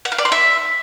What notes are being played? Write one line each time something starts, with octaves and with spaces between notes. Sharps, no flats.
F#5
F5
D5
C6
E5